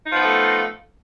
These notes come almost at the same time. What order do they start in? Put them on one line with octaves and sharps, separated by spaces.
D#4 F3 B3 F4 A3